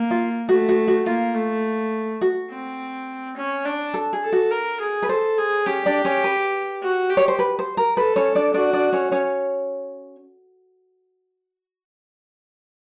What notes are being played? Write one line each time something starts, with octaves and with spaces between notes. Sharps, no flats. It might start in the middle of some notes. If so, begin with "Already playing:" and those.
Already playing: A#3
F4
A3 F#4
F#4
F#4
A#3 F4
A3
F#4
C4
C#4
D4
A4
G#4
A4
F#4
A#4
G#4
B4
A4 C5
G#4
C#4 G4 C#5
D4 D5
C#4 C#5
B4
F#4
G4
C#5
C5
B4
C5
A#4
A4 B4
C#4 C#5
D4 D5
D4 F#4 D5
D4 D5
C#4 C#5
C#4 C#5